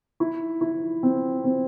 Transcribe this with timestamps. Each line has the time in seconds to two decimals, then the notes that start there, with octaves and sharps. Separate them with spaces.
0.20 E4
0.61 E4
1.03 C4
1.44 C4